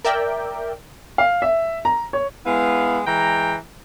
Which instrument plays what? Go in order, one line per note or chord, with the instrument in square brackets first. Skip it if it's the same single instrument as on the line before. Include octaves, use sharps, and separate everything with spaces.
[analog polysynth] A#4 D5 E5 G5
[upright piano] F5
E5
A#5
C#5
[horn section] G#3 B3 E4 B4 F5
E3 G#3 G5 A#5